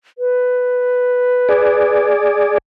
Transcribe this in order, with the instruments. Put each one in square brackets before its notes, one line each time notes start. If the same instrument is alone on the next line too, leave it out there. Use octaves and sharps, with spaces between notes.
[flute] B4
[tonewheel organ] G#4 D5